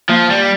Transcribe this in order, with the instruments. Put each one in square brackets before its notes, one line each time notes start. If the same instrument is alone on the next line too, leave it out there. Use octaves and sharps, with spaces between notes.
[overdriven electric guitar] F3 [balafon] A#3
[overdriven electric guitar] G3